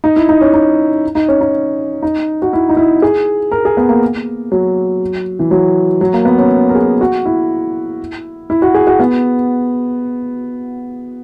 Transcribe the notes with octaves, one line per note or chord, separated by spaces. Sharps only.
D#4
E4
D#4
C#4
D#4
D#4
C#4
D#4
D#4
F#4
E4
D#4
E4
G#4
A#4
G#4
B3
A#3
F#3
E3
F#3
F#3
A#3
B3
C#4
A#4
G#4
F#4
E4
E4
F#4
G#4
F#4
B3